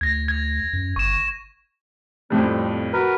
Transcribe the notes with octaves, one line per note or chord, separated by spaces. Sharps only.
D2 G#6 A#6
G#6
F#2
G1 C#6 E7
F2 A2 G3 C4
F#4 A#4 B4